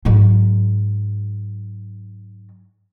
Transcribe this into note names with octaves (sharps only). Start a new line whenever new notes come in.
G#2 F#3